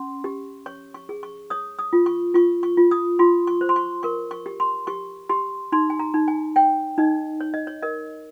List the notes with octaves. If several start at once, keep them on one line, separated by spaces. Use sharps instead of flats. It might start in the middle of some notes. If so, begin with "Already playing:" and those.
Already playing: C#4 C6
G4
C#5 C#6
C#6
G#4
C#6
C#5 D#6
D#6
F4
C#6
F4 C#6
C#6
F4
D#6
F4 C6
C#6
C5
C6
C#6
A#4 C#6
C#6
G4
C6
G4 C#6
G4 C6
D#4 C6
G#5
A#5
D#4
G#5
C#5 G5
D#4 D#5
C#5
D#5
C#5
A#4 D#5